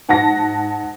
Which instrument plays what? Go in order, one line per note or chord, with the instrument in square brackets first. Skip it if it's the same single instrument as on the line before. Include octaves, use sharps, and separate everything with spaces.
[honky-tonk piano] G#2 F#5 A5 A#6